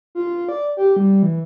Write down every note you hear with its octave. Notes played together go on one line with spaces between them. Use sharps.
F4
D5
G4
G3
E3